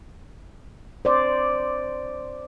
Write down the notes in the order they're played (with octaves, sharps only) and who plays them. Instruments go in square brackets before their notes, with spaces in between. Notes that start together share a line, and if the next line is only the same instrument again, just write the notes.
[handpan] C5 D5